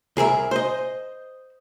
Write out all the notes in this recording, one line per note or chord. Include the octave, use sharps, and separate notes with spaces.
C2 G#4 A#4 E5
C5 D#5